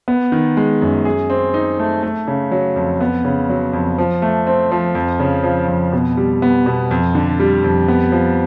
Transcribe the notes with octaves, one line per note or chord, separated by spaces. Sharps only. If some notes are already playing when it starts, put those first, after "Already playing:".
B3
D#3
G#3
F#2
G#4
C4
D#4
A3
A3
C#3
F#3
F2
B3
C#3
F#3
F2
F3
A3
C4
F3
F2
C#3
F3
F2
B2
G3
B3
B2
F2
D3
G3
F2
B3
F3